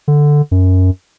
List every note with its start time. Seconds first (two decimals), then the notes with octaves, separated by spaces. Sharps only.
0.08 D3
0.51 F#2